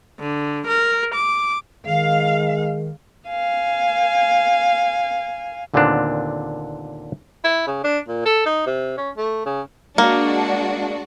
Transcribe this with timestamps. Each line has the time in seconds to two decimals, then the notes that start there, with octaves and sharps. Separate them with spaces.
0.19 D3
0.67 A#4
1.15 D6
1.86 D#3 G#3 F5
3.28 F5 G#5
5.74 D#2 A#2 D3 B3 C4 D4
7.44 E4
7.67 C#3
7.84 D4
8.08 A#2
8.26 A4
8.46 D#4
8.66 C3
8.98 C#4
9.17 A3
9.46 C#3
9.98 G#3 A#3 D4 F#4